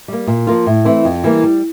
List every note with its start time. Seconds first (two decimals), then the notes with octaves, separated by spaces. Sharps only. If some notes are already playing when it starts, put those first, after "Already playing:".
0.08 G3 A#3
0.27 A#2
0.47 F3 A#3 F4
0.66 A2
0.85 E3 A3 C4 E4
1.05 F2
1.24 E3 G3 A#3
1.43 G3